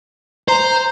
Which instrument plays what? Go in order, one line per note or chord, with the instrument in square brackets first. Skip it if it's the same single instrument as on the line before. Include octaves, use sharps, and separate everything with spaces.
[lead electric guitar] C5 [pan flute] A#5